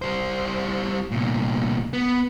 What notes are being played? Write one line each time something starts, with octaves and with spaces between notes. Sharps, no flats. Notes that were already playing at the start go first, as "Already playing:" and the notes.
G3 C5
C2 A#2
B3